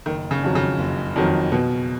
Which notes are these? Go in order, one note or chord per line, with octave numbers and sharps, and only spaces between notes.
F#1 D#3
C#3
F2 D#3 F#3
C#3
F#1
F2 D#3 F#3
B2